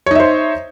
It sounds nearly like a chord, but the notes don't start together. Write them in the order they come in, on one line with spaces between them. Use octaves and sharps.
C#5 D#4 E5 C5